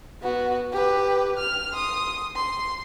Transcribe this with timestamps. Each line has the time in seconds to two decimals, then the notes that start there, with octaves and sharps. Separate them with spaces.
0.22 B3 F#4
0.72 G4 B4
1.38 F6
1.73 C6 D#6
2.36 C6